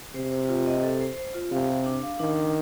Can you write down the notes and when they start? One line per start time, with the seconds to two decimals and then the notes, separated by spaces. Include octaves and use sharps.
0.15 C3 C5
0.31 C5
0.49 F4
0.66 D#5
0.83 A4
1.01 C5
1.18 C5
1.34 F4
1.52 C3 F5
1.69 G4
1.86 D4
2.03 F5
2.19 D#3 D4
2.36 D4